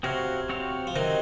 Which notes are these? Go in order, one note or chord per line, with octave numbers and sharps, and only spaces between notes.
C3 C4 F#4 C#5 F5
C4 F#4 C#5 F5
F3
C3 D#3 F#3 C4 D#4